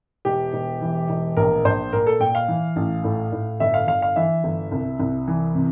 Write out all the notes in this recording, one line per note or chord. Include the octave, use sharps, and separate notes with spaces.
E1 G4
E1
E3
E1
A#1 A#4
A#1 C5
A#2 A#4
A4
A#2 G5
F5
E3
A1
A2
A2
G1 E5
F5
G1 F5
F5
E3 E5
G1
C2
C2
E3
C3